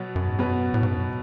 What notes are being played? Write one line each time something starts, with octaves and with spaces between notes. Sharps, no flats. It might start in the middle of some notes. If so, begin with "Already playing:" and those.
Already playing: B2 F#3 B3 F#4 B4
F#2
G#2
F#2 B2 F#3 B3 F#4 B4
A2
G#2
F#2